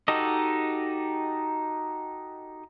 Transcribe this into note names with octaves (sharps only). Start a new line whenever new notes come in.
D#4 F#4 G4 A4 D#5